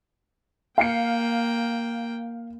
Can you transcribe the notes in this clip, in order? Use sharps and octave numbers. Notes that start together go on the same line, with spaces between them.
A#3 F5 G5 C7 C#7